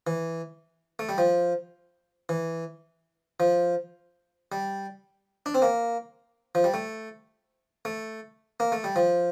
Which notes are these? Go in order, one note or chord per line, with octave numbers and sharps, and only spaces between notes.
E3
A3
G3
F3
E3
F3
G3
D4
C4
A#3
F3
G3
A3
A3
A#3
A3
G3
F3